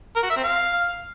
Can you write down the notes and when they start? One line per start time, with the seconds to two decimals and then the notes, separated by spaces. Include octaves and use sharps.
0.16 A#4
0.23 F#4
0.30 E5
0.37 C4
0.44 F5